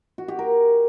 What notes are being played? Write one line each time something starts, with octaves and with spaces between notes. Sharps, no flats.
F#4
G4
A#4